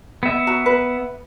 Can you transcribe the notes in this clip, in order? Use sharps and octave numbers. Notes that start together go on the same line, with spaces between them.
B3 E5
F#4 A#5
B4